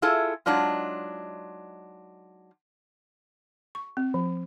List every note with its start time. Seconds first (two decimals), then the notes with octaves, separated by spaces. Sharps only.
0.02 E4 F4 G#4 A4 E5
0.46 F#3 G#3 D4 D#4 F4
3.75 C#6
3.97 C4
4.14 F3